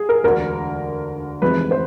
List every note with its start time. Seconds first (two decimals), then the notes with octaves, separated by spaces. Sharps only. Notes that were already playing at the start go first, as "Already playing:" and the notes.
Already playing: G#4
0.09 A#4
0.23 E1 D2 D3 A#4
1.42 F1 F2 C3 E3 G#3 B4
1.71 C5